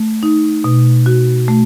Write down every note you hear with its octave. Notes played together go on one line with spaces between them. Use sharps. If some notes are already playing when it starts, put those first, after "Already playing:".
Already playing: A3
D#4
B2
F#4
A3